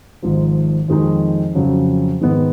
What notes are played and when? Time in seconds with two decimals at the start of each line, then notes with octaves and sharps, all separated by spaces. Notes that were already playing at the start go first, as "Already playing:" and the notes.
0.22 G#1 G#2 F3
0.88 F2 D#3 G#3 D#4
1.55 F2 C#3 F#3
2.21 G#2 D#3 G#3 B3